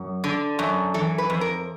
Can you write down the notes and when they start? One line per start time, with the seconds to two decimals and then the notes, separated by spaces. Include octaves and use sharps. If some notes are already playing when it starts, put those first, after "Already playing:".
Already playing: F#2
0.24 D3
0.59 F#2
0.94 E3 A4
1.18 B4
1.30 F2
1.41 A#4